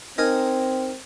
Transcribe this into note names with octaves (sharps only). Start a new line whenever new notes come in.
C4 D#4 A#4 G#5